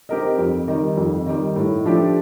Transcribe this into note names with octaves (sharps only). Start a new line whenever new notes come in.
C4 G4 A#4 D#5
F2
D#3 G3
F2
D#3 G3
A2
F3 A3 D4 G4